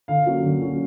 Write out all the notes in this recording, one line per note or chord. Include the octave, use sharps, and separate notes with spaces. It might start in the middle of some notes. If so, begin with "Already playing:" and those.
D3 F5
F#3 A#3 C#4
D3
F#3 A#3 C#4